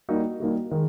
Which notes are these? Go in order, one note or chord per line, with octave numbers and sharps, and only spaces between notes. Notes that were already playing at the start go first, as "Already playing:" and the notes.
G3 A#3 D#4 F#4
G3 A#3 D#4 F#4
D#3 G#3